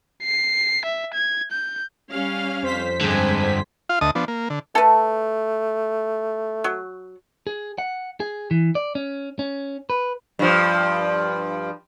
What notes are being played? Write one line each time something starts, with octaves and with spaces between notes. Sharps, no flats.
C7
E5
G#6
G6
G3 C#4 F5
F2 C5 B6
G2 D3 G#3 G#5
F4 F5
D2 D#5 A5 D#6
F3 B3 D4
A#3
D3
A3 A4 B4
F#3
G#4
F#5
G#4
E3
D5
C#4
C#4
B4
G2 F3